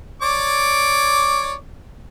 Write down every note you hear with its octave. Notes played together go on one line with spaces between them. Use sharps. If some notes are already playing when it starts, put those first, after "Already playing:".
C#5 D5 D6